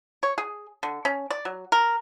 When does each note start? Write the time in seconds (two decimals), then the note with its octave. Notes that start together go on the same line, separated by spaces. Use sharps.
0.23 C#5
0.38 G#4
0.83 D3
1.05 C#4
1.30 D5
1.45 F#3
1.72 A#4